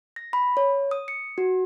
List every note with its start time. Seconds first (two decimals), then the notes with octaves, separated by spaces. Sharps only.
0.16 A#6
0.33 B5
0.57 C#5
0.91 D#6
1.08 C#7
1.38 F#4